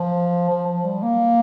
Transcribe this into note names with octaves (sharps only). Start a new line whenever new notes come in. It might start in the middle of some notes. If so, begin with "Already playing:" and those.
Already playing: F3
F3
F3
G3
A#3